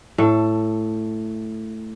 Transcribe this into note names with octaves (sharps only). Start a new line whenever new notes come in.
A2 A4